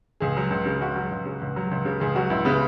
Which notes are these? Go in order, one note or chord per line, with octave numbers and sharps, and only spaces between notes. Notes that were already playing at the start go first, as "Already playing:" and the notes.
C#2 G#4
F#3
C#2
C#3
C#2 F#4
F#3
C#2
C#3
C#2
F#3
C#2
C#3
C#2 G#4
F#3 F#4
C#2 E4
C#3 B3